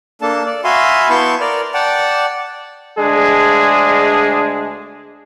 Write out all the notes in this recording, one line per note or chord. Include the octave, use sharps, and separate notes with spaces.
A#3 D4 A4 A5
D5
F#4 E5 F5 G#5 B5 C6
B3 E4 A5 C6 C#6 G6
A#4 D5 F6
D5 F#5 G5 A5
D2 G#3 D4 G#4